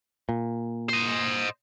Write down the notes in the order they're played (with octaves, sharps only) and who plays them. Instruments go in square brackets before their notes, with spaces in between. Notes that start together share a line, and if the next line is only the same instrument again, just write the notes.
[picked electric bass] A#2
[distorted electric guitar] C5 D#5